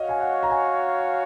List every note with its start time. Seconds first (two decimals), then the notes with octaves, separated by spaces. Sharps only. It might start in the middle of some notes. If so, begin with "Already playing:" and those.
Already playing: F#4 C#5 D#5 F5
0.09 G#5
0.20 F#5
0.43 A#5
0.50 G#5